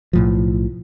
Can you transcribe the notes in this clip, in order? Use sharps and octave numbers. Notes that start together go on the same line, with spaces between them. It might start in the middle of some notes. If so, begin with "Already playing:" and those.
B1 A2 F3